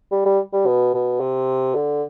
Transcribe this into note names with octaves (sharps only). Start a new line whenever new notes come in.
G3
G3
G3
B2
B2
C3
D3